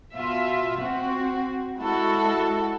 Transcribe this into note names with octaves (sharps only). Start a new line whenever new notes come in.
B2 F4 E5
C4 F#4
G#3 E4 F#4 A4